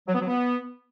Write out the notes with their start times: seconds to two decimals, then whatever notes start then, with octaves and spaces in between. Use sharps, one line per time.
0.08 F#3
0.14 B3
0.21 F#3
0.27 B3